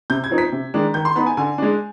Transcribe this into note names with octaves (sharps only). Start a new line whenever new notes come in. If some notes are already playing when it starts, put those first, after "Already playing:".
C3 G6
G#6
F3 C4 D#4
B6
C3
D#3 G#3 D4
D#3 G6
C6
B3 D#4 B5
G#5
D3 G#5
G#3 D4